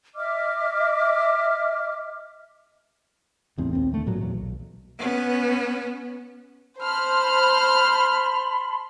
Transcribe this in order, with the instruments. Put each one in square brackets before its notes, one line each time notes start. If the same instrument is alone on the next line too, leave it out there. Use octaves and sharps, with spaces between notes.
[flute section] D#5 E5 D6 F6
[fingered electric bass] F#1 E2 A2 C4
A#1 D#2 C4
D2 A3
G#1 A#2 D#3 F#3
E2 A#2 F#3
B1
[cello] B3 C#4
[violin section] C5 F6 [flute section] A5 B5 C6